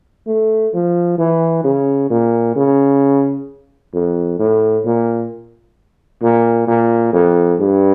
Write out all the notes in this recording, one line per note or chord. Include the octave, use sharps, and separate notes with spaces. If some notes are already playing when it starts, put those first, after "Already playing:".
A3
F3
E3
C#3
A#2
C#3
F2
A2
A#2
A#2
A#2
F2
G2